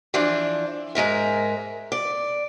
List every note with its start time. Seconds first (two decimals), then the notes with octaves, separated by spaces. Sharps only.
0.14 E3 F3 D4
0.95 G#2 G#3 A#4 E5
1.92 D5